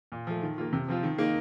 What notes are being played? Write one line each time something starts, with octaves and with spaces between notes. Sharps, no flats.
A#2
F3 A3
D#3
A#3 F4
C3
F3 C4 F4
D#3
A#3 D#4